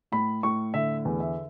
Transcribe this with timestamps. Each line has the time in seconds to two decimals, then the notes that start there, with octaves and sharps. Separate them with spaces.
0.12 A2 B5
0.43 A2 C#6
0.74 D3 E5
1.05 E2
1.20 E5